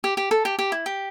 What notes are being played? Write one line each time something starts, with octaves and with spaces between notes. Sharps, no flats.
G4
G4
A4
G4
G4
E4
G4